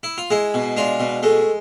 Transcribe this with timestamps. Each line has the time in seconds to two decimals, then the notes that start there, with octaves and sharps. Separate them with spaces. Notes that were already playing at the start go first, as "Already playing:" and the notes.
0.03 E4
0.18 F4
0.30 G#3 E4 G#4
0.54 B2
0.76 G#3 D4 F4
1.00 B2
1.23 G#3 A3